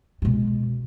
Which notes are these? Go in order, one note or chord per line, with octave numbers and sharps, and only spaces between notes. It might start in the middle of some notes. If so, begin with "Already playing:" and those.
B2 G#3